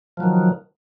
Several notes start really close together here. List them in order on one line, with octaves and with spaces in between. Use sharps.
F3 F#3 D#3